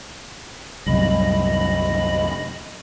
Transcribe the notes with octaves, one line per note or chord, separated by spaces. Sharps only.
C2 F#2 A2 D#5 B5